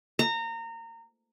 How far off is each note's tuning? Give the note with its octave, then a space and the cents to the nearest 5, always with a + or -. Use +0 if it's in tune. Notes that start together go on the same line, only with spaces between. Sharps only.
A#5 -25